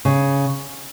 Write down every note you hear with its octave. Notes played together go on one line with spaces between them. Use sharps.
C#3